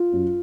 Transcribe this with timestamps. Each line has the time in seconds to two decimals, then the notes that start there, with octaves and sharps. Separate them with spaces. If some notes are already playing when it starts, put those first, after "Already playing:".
Already playing: F4
0.12 F#2